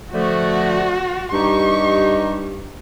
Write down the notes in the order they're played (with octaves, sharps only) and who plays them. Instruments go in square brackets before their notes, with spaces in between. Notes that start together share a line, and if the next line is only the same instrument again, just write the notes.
[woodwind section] D3 F3 A3 [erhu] F#4
[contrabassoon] G2 [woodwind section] D#4 G4 [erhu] C#6